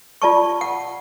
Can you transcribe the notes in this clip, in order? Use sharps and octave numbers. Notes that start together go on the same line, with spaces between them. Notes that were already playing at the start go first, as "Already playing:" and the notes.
F4 D5 A5 C#6
F#5